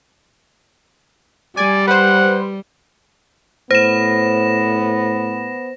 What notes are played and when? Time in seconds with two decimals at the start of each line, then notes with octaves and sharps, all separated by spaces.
1.57 G3 D5 G#5
1.88 B4 C5 F#5
3.71 A2 B3 C5 A#6 E7